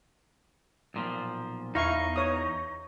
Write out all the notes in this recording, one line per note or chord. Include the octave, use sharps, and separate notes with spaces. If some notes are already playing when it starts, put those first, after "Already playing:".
B1 A#2 F3
E2 D#4 E4 F5 C#6
C#5 D#6